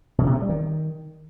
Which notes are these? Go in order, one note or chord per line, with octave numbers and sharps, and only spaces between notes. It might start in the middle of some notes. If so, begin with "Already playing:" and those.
B2
C3
A3
G3
D#3